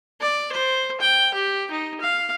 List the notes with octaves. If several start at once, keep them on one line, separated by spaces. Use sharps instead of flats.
D5
C5
G5
G4
D#4
F5